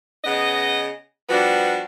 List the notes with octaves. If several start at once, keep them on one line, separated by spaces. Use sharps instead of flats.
C#3 B3 D#5
F3 G3 B3 D4 F#4